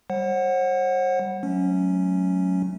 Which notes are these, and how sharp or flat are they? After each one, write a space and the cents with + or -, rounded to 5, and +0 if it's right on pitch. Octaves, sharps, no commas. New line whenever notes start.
G3 +0 C5 +45 F#5 +0
F#3 +0 A3 -20 C#4 +0